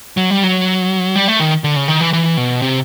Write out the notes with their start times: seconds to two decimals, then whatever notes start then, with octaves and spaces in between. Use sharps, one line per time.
0.17 F#3
0.30 G3
0.44 F#3
1.16 G3
1.28 A3
1.40 D#3
1.64 D3
1.76 C#3
1.88 D#3
2.01 E3
2.13 E3
2.37 B2
2.62 C3